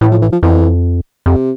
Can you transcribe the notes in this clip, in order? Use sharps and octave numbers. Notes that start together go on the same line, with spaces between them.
A2 E3
F3
E3
F3
F2 E3
F2 C3